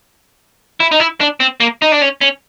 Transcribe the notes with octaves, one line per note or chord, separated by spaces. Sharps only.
E4
D#4
E4
D4
C4
A#3
D#4
D4
C#4
C#4